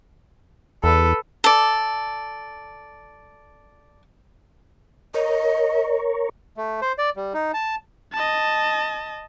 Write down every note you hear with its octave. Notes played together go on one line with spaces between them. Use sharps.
E2 A4 B4
A4 D5
A#4 C#5 D#5
A3
C5
D5
G3
D#4
A5
D#5 A5